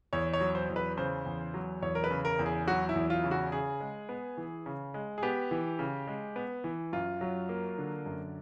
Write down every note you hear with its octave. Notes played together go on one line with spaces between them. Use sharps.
E2 C#5
C#5
F#3
C5
E2
B4
C#3 C5
E2
F#3
E2 C#5
A#4
B4
C#3
A#4
E2
G#4
F#3 F#4
E4
E2
F4
C#3
F#4
C#3 G#4
G#3
B3
E3
C#3
G#3
G#4
B3 G4
E3
C#3
G#3
B3
E3
F#2 F4
F#3
A#3
D3
F#2